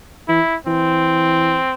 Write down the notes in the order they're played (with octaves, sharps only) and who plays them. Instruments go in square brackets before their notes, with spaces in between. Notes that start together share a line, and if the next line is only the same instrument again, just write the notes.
[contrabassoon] E3 [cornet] E4
[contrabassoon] E3 [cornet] C4